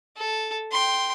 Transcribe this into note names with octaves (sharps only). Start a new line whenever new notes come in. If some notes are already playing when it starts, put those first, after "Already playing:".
A4
G5 C6